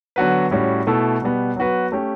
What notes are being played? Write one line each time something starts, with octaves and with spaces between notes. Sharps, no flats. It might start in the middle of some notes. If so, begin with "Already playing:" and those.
D3 F#3 B3 F#4 B4
A2 G3 C#4 F#4
B2 A3 E4 A4
B2 G3 B3
F#3 B3 F#4 B4
A3 C#4 G4